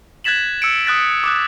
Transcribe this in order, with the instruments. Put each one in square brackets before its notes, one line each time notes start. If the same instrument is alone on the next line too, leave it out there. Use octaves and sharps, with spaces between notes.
[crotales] F#6 G#6 A6 B6 E7 F#7
E6 C#7 D7
D#6 F#6 A6 B6
D6 D#6 F#6